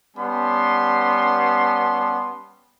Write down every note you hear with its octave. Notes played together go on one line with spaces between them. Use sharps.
G3 B3 C#4 A5 C6